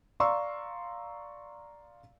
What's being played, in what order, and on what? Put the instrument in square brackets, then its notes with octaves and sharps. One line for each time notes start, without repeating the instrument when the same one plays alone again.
[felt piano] D5 F5 A#5 C6 C#6 E6